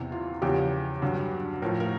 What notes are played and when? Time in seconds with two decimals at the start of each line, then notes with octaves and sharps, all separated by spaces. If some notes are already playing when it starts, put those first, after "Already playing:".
Already playing: E2 C3 E3
0.12 F4
0.42 E2 C#3 F3 G4
1.02 G2 D3 F#3
1.62 A2 F3 A#4
1.80 A#4